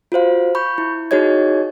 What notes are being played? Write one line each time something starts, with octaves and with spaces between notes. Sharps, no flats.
F4 F#4 C5 F5
B5 C#6 G6
E4
D#4 F#4 G#4 C#5 D#5 G#6